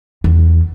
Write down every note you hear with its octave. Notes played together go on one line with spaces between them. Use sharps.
E2